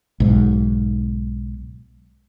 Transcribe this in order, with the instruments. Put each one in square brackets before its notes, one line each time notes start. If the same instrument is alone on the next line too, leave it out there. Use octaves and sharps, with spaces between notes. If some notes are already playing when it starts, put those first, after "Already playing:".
[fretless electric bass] B1 G#2